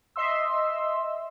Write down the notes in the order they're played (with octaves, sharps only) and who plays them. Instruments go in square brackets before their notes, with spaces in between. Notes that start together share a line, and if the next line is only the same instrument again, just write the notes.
[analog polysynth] D#5 E5 C6 E6